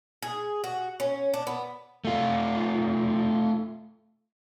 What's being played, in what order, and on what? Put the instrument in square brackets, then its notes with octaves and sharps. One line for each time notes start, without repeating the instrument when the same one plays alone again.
[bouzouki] G#4
F#4
C#4
D4
B3
[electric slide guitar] A3 F4